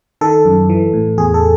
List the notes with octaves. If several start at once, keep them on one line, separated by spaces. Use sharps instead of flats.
D#3 A4
F#2
E3
A2
E2 G#4
A4